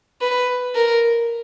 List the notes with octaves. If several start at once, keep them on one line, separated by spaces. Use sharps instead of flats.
B4
A#4